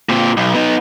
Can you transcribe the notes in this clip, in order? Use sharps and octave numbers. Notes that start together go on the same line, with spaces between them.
A#2 C4
B1
B3 D#4